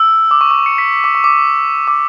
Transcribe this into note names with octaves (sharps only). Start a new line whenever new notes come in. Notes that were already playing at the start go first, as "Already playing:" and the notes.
Already playing: E6
D6
C#6
C#6
C#7
B6
D6
C#6
D6
D6